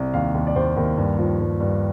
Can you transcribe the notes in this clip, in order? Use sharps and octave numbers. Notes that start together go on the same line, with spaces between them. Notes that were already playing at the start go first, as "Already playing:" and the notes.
Already playing: C2
D#2 F5
D#2
D5
D#2 C5
D#2 A#4
G2
F3
G2
G2